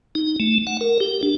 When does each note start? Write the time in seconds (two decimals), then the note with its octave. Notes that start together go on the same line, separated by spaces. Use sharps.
0.15 D#4
0.40 A3
0.67 F#5
0.81 A#4
1.00 G4
1.23 D4